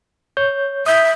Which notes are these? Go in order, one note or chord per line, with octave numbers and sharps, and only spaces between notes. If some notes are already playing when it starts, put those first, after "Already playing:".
C#5 G6
E5 D#6 G6